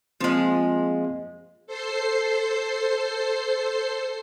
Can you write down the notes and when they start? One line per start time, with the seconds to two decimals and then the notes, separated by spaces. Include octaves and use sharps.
0.21 F3 G#3 A#3 C4 F4
1.67 A4 C5 C7